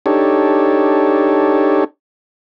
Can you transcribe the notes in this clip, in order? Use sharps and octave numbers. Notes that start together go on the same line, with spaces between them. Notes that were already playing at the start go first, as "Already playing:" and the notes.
D4 D#4 G4 A4 C#5